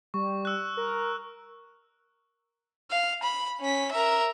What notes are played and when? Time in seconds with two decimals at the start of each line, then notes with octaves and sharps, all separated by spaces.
0.14 G3 C#6
0.45 E6 F#6
0.77 A#4
2.90 F5
3.22 B5
3.60 C#4 B6
3.92 A#4 E5